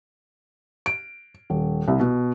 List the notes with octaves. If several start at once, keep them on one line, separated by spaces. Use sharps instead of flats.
D7
D#1
C2
B2